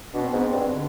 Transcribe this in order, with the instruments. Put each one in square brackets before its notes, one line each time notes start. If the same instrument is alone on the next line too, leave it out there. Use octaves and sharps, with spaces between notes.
[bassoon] B2 [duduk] D4
[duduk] C4
[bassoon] G#2 [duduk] B3
[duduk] C4
[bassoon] G2
[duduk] D3